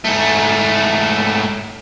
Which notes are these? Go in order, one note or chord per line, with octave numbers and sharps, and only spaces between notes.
G#2 A3